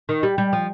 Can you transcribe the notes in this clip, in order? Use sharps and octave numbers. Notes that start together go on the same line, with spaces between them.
D#3
G3
G3
F3